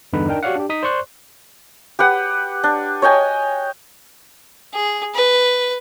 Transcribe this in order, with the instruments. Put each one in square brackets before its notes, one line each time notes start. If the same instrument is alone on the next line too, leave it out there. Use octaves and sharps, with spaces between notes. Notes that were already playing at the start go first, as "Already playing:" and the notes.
[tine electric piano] E2 G2 D3 D#4 B4 B5
D4 D#4 A#4 G5
F#4 G4 C#5 D5 F5 F#5
D4 G4
D#4 D#6 B6
C5 D5 C6 C#6 F#6
[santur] G4 B4 F#5
D4
C#5 D#5 G5 G#5
[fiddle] G#4
B4